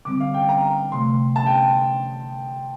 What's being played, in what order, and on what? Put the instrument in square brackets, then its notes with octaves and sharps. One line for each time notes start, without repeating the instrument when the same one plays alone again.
[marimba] D3 G3 C4 [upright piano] D6
[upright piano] F5
G5
A#5
[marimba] C3 F3 A3 [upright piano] C6
[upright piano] A5
G5